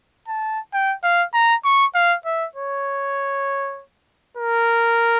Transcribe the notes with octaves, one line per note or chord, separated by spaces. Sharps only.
A5
G5
F5
A#5
C#6
F5
E5
C#5
A#4